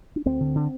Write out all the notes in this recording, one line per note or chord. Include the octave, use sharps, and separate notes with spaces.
D4
D2 C4
D3
D3